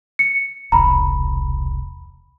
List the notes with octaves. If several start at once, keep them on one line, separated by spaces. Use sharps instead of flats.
C#7
E1 C2 A#5 B5